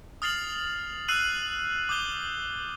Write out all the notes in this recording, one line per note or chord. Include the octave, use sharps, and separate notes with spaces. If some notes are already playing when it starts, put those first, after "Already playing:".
D#6 F6 A6 C7 F7 F#7
E6 F#6 C7 D#7 F7 F#7
D6 D#6 G6 G7